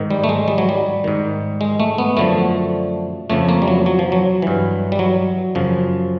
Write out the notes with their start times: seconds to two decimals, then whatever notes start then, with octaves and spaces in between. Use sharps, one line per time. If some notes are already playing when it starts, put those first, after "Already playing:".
Already playing: G#2 D#3
0.10 G3
0.24 A3
0.29 G#3
0.48 G3
0.58 F#3
0.69 G3
1.04 G#2 D#3
1.61 G#3
1.80 A3
1.98 B3
2.17 F#2 D3 F3 A3
3.30 F2 C#3 F3 A3
3.49 A#3
3.62 G3
3.68 F#3
3.86 F#3
3.99 F3
4.12 F#3
4.42 G2 E3
4.92 G3
4.99 F#3
5.55 F#2 C#3 F3